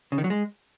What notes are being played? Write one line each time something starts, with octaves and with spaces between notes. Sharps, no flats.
C#3
D#3
F#3
G#3